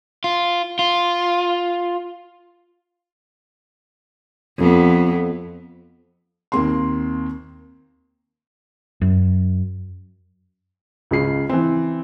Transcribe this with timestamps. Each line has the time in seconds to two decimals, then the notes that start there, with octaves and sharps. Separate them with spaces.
0.24 F4
0.79 F4
4.58 F2 B3
6.52 D#2 A#3 C4 C6
9.02 F#2
11.11 C#2 C#3 C7
11.49 E3 C4